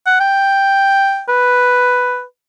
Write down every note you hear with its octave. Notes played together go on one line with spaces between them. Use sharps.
F#5
G5
B4